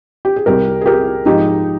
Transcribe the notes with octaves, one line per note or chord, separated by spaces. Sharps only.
G4
G#4
C2 C3 G3 G4 A#4
G#4
G4 A#4
G#2 F3 G#3 D#4 G4